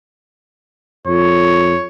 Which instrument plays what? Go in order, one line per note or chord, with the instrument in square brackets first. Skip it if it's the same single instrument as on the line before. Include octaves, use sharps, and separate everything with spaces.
[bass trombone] F2 [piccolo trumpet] C#5